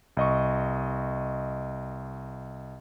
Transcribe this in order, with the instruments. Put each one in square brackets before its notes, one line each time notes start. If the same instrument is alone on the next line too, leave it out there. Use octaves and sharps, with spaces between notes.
[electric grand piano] C2 D#5 C#6